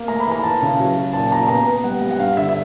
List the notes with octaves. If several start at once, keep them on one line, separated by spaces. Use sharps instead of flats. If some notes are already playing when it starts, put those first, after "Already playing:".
Already playing: A#3
A3 A#5
B5
E3 A#5
E3 A5
C#3
F#3
F#3
A#2 A5
A#2 A#5
B3 A#5
B3
G3 F#5
G3
F#5
G2 F5
D3 E5
E5